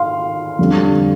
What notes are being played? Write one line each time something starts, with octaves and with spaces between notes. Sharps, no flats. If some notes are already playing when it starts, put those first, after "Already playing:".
Already playing: F5 C6
F2 D3 G3